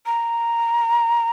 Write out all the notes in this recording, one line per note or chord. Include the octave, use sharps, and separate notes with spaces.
A#5